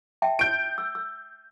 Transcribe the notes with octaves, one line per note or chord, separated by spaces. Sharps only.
E5 G5 A5
G6 D7
E6
E6